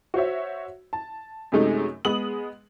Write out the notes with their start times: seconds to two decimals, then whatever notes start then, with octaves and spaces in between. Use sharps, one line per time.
0.14 F#4 C5 C#5 E5
0.93 A5
1.52 F#2 C3 F#3 G#3 A3 D#4
2.05 G#3 B3 D#6 F#7